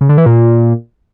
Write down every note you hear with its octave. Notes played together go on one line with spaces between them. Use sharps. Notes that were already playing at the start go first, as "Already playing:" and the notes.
C#3
D3
E3
A#2